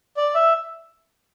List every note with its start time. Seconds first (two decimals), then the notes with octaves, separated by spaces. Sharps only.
0.17 D5
0.35 E5